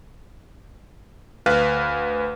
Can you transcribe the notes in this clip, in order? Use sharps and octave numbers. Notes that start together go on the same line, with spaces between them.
D2 B4 F5 F6 F#6